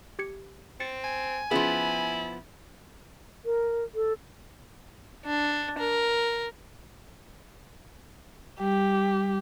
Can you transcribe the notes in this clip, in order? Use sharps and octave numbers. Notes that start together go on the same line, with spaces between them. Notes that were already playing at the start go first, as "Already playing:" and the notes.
G4 G#6 C#7
C4 A6 C#7
G#5
F3 B3 C#4 E4 F4 G#4
A#4
A4
D4
A#4
G3 G4